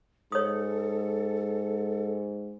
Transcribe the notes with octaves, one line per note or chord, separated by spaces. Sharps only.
G#2 A4 C#5 D#6